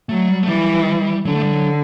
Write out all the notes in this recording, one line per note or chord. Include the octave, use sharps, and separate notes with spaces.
F#3 A3
G3
A3
E3 G3
D3 F#3
A3
G3
F#3